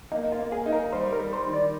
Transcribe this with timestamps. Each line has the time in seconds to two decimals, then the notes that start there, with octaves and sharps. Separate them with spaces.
0.12 A#3 D#4
0.32 F4
0.39 A#3
0.52 G#4
0.66 D#4
0.72 A#4
0.92 G3 C5
1.13 A#4
1.19 G3
1.33 C5
1.47 D#3
1.53 D5